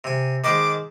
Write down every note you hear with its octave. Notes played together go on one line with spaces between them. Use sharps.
C3 G#5
D#3 G#3 C5 D6